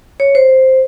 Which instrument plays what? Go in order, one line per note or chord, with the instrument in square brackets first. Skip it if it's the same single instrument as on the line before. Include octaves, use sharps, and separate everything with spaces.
[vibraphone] C#5
C5